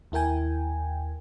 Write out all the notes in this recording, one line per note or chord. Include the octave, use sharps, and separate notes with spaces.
D#2 E4 A#4 G5 G#5